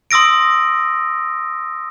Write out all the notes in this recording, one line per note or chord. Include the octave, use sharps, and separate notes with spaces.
C6 D#6 E6 A#6 D7